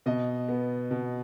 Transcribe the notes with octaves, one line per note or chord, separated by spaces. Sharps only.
B2 D#5
B3
B2